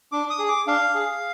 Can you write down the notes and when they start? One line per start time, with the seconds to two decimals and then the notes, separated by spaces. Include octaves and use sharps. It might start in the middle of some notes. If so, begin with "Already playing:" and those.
0.12 D4 D6
0.30 D#6
0.39 G#4
0.49 D6
0.67 D4 F5
0.95 G#4